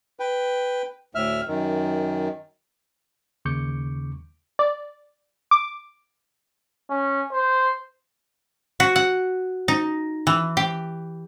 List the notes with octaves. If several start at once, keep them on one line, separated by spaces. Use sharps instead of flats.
B4 G5
D2 A2 E5 F6
F#2 D#3
D#2 C#3 C#6 D6 G6 C#7
D5
D6
C#4
C5
F#4
F#5
D#4
E3
G4